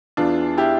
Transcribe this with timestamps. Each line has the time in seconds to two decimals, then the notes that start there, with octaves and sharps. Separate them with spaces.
0.17 E2 E3 D4 F4
0.57 E4 G4